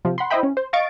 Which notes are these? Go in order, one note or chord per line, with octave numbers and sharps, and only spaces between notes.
C3 F3
F#5 B5 C6
E4 C5 D#5 E5 G5 B5
C#4
C5
D#5 F5 C#6 A6 D7